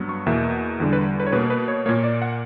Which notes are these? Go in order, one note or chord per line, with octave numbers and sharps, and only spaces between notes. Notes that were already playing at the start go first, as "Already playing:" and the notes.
Already playing: G2 F#3 B3
C#6
E2 B2 A#3 E5
E2 D3 G3
B4
B4
C#5
B2 A#3 B4
B4
C#5
A#2 A#3 C#5
D5
F#5